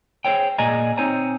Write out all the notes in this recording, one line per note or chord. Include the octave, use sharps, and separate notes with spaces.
G#4 A4 C5 C#5 G5
A#2 G#4 D5 D#5 G#5 A#5
C4 D#4 C5 C#5 G#5 A#5